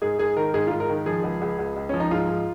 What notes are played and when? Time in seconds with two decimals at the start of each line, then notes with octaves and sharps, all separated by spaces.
0.02 G#2 G#4
0.19 G#2 G#4
0.37 D#3 A#4
0.54 G#2 G#4
0.67 F4
0.71 G#2
0.80 A#4
0.89 D#3
1.06 F3 G#4
1.23 C#2
1.41 C#2
1.59 C#2
1.76 C#2
1.89 F3 C#4
2.00 D#4
2.11 G#2 F4
2.29 G#2